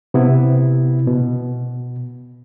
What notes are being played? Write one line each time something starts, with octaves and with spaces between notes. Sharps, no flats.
C3 B3 E4
B2